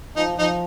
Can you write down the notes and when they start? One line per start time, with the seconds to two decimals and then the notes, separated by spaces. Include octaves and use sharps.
0.15 F3 D#4
0.38 F3 D#4